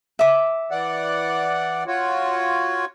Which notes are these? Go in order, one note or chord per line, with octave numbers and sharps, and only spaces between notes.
E5 D6
E3 D5 F#5
F4 F#4 C#5